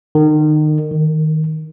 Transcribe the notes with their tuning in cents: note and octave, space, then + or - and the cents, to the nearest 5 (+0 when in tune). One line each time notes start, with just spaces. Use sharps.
D#3 -30
D#3 +10